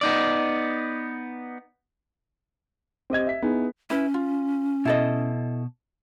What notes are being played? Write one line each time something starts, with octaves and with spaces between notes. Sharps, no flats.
B3 D#4 D5
C4 G4 D#5 G#6
E5 B6
B3 D#4 E4 G#4
C#4 E4 B4
F4
B2 E4 A4 D#5